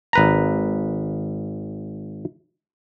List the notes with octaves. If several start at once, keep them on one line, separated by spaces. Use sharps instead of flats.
G#1 B4 A#5